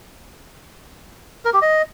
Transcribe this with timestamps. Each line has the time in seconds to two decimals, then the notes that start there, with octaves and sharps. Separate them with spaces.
1.45 A#4
1.53 G4
1.62 D#5